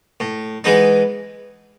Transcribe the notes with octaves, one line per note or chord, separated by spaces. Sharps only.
A2
E3 G#3 B3 D#4